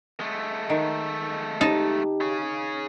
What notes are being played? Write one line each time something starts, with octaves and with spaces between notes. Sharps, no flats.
G#3 A3
D#3
D#4 G4 A5
G#4 C#5